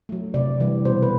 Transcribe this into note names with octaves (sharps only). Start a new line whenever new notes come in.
F#3 A3
C3 D5
E3 G3
B2 C5
B4